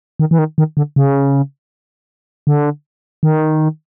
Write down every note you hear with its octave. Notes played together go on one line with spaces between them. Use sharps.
D#3
E3
D#3
D#3
D3
C#3
D3
D#3